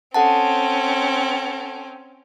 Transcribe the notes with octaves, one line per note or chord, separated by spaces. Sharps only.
C4 C#4 A4 F#5 A5